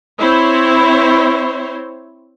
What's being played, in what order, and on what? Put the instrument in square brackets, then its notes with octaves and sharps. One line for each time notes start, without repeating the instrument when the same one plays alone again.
[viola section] C4 E4 C5 C#5